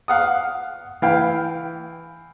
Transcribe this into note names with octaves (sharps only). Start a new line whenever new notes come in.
F5 F#5 D#6
E3 F5 G5